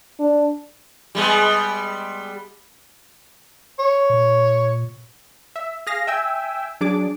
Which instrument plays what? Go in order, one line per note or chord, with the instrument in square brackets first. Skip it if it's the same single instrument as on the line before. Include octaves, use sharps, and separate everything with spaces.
[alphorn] D4
[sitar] G3 G#3 B3
[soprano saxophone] C#5
[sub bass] A#2
[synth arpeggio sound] E5
G#4 F5 A#6
E5 G5 G#5 E6
F#3 D4 G#4 D6